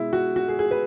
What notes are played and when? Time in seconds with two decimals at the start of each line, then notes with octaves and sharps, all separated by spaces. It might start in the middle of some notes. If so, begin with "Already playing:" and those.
Already playing: B2 G#3 E4
0.13 F#4
0.36 F#4
0.48 G#4
0.59 G#4
0.71 B4